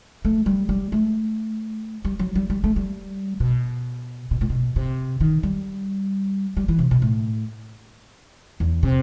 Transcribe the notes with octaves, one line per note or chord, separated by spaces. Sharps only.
A3
G3
G3
A3
G3
F#3
G3
G3
A3
G3
B2
B2
A2
B2
C3
D#3
G3
G3
E3
C3
B2
A2
E2
C3